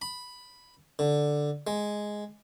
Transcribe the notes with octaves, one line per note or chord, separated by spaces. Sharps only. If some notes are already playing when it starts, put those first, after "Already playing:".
B5
D3
G#3